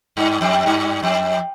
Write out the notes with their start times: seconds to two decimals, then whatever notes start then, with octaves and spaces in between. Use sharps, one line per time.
0.17 G2
0.41 F2
0.66 G2
1.03 F2